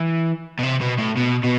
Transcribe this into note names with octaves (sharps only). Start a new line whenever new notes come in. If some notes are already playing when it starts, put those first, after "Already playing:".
Already playing: E3
B2
C3
B2
A2
B2
B2